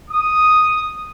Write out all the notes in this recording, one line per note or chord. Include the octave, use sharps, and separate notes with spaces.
D#6